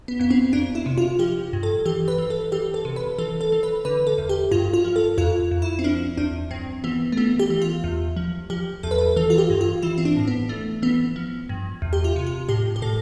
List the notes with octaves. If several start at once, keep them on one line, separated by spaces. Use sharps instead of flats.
B3
F2 B3
C4
F2 D4
E4
C3
F4
F3 G4
G2
A4
E3 G4
B4
E3
A4
E3 G4
A4
C3
B4
E3 A4
A4
E3
B4
D3 B4
A4
E2
G4
G2 F4
F4
F3
A4
F2 F4
F2
E4
C4
F3 D4
E2 D4
G2 C4
E3 B3
A3
E3 B3
G4
E3
F4
E2
F3
F3 G4
E2 A4
B4
A4
E3 A4
F4
G4
G2
F4
E3 E4
C4
D4
A2
B3
E3 A3
E3 B3
F3
G2
E2
G4
F4
C3
F4
A2 G4
G4
A2 A4